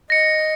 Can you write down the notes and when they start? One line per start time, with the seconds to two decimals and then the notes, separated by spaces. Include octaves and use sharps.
0.10 D#5 A#6 C#7